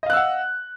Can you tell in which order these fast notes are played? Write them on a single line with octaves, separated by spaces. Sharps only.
D#5 F5 F#6 E6 F#5